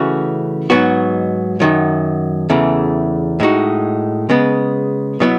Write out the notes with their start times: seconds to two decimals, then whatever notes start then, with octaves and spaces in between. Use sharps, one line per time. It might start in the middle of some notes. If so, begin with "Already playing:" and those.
Already playing: C#3 E3 A3 C#4 F#4
0.70 G#2 F#3 B3 D#4 F#4
1.60 F#2 D#3 F#3
2.50 E2 C#3 E3 A3
3.40 A2 G#3 D#4 F#4
4.30 C#3 G#3 B3
5.20 B2 F#3 B3 E4